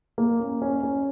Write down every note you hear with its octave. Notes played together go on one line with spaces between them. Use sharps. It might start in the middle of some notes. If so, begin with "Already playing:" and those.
A#3
C#4
C#4
C#4